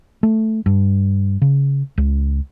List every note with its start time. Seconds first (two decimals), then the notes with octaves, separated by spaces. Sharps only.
0.23 A3
0.66 G2
1.42 C#3
1.98 C#2